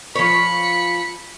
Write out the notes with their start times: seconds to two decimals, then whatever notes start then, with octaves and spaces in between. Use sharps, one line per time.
0.16 F3 C#5 B5 C#7